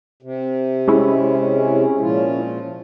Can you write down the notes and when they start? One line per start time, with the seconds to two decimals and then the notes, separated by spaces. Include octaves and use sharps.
0.22 C3
0.88 G#3 C#4 E4
2.01 A#2 F3 F4